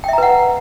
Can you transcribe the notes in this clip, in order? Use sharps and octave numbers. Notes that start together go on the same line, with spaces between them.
B4 E5 F#5 G5 A#5